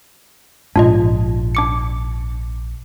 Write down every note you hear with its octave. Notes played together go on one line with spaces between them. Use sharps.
A#1 G#2 D4 F4 D#5
D4 D6 C#7